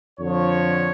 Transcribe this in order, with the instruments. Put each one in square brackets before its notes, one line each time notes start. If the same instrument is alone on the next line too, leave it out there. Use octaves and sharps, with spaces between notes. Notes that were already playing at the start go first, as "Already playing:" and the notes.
[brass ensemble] F2 D3 F3 C#5